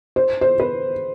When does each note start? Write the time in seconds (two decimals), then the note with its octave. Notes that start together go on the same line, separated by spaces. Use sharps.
0.16 C5
0.41 C5
0.60 B4